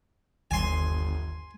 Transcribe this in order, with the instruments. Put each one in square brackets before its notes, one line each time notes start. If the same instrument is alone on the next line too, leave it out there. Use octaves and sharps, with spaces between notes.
[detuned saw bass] G1 [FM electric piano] D#2 [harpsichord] G#5 C6